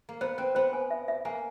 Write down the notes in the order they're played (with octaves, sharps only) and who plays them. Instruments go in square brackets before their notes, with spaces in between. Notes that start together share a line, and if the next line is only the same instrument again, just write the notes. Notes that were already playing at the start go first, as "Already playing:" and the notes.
[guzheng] A#3
[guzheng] B3 [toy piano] C5
[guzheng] C4 [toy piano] C5
[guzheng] B3 [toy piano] C5
[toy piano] G#5
E5
E5
[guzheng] A#3 [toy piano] G#5